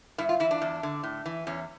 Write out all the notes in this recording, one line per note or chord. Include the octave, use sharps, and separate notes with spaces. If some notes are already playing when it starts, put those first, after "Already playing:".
G2 E4
F4
E3 E4
D4
E2
D3
A2
E3
E2 C#4